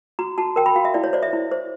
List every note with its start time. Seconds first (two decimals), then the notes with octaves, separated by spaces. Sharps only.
0.19 F#4 A#5
0.38 F#4 A5
0.56 A#4 G5
0.66 B5
0.76 F#4 F5
0.85 E5
0.94 E4 D5
1.04 C#5
1.13 C5 D5
1.23 E5
1.33 E4
1.51 C5